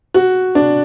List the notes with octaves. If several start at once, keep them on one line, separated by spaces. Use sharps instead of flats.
F#4
D4